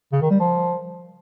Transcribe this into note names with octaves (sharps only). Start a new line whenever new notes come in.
C#3
D#3
G3
F3